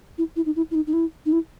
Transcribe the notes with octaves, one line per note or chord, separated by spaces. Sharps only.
E4
E4
D#4
E4
E4
D#4
D#4
E4
D#4
E4